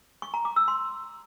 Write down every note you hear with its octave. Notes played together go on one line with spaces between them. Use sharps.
C#6
A#5
D6
E6
C6